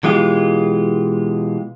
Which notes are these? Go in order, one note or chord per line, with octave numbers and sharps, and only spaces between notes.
B2 E3 G#3 F4 G4